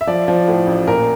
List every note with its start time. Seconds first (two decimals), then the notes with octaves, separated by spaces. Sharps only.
0.01 E5
0.07 F3 D5
0.28 F3
0.48 A2
0.67 A1
0.87 A#2 A#4